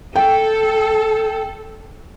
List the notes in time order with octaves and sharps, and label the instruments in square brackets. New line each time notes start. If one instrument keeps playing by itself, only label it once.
[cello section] A4 [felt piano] G5